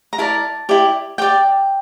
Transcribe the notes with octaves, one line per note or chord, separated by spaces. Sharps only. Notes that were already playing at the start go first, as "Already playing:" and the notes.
A#5
E4 A#4 D5 A5
E4 G4 D5
G4 D5 G5